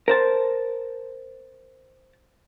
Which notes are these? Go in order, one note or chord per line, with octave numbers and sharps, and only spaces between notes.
A#4 C5 A5